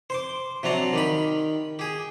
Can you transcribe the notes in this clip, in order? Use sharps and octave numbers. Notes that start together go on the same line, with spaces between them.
C5 C6 D6
C3 F#3 D4 A#5
D#3 G4 B5
G4 G#4